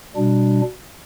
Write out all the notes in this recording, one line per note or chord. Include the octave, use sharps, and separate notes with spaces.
B2 G3 D4